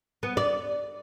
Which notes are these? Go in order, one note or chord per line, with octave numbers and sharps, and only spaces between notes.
B3
D5